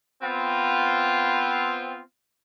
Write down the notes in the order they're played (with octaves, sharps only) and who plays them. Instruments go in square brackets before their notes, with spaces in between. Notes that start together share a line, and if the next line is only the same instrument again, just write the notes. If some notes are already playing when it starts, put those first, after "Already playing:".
[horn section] B3 C4 F4